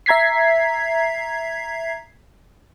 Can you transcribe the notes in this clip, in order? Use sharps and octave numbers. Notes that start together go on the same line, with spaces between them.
E5 A#5 G#6 B6 C7